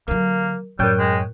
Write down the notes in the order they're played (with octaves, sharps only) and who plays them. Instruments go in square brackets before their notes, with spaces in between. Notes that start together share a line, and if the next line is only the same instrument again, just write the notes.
[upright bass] D3 F#3 [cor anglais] A#3 [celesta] A#4
[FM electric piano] F#2 C#5 G5 [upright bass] A2 [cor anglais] G3 [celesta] A#4 F#6
[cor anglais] G#3